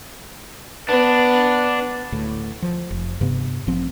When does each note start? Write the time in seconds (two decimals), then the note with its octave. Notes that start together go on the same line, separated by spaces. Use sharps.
0.89 B3 D4
2.12 D2 A2
2.62 F3
2.90 F1
3.21 G2 C3 B3
3.67 A1 A2 F3 C4